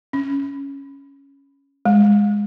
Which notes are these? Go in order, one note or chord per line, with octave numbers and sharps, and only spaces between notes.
C#4
G#3